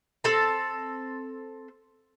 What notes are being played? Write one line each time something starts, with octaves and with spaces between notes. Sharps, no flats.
C4 A4 A5